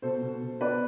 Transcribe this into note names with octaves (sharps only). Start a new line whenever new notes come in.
B2 A4 C5
B2
B2
B2 B4 D5